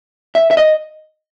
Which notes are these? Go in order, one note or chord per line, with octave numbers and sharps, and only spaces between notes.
E5
E5
D#5